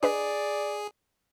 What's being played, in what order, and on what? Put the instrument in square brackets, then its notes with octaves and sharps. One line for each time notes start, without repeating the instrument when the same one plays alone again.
[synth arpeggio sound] D4 B4 D#5 [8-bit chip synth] G#4 [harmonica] D5